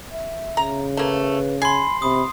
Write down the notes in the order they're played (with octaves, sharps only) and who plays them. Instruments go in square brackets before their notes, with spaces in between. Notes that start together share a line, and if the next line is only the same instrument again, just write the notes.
[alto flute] E5
[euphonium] C#3 [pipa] A#5
[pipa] A3 A#3 [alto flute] B4
[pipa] G#5 [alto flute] B5 [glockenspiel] C6 C7
[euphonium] C3 [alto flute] B5 [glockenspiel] D#6